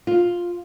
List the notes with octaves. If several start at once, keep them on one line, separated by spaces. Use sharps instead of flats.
F4